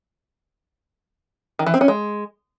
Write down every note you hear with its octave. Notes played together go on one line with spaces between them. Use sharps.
D#3
E3
C4
C#4
G#3